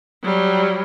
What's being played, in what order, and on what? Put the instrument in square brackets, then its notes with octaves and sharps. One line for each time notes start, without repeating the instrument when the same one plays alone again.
[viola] F#3 G3